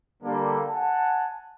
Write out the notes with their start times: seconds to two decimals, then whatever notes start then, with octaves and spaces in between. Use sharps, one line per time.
0.23 D3 G3 A#3 D4 G4 A4
0.69 F#5 G#5 A5